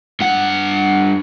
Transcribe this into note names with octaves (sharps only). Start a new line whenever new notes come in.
G2 F#5